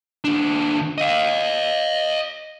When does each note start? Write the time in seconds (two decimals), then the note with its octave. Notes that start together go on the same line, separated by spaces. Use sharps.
0.24 D#2 D4
0.98 D#5 F5